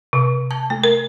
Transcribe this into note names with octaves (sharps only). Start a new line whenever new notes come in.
C3
A5
A3
A#4